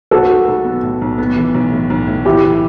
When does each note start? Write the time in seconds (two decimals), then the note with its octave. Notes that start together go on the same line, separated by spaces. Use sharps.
0.11 B1 F#4 A4
0.29 B1
0.48 B1
0.65 B3
0.83 A2
1.01 B1
1.18 B3
1.36 E3
1.54 B1
1.72 A2
1.90 B1
2.07 A2
2.25 E3 E4 G4
2.43 E3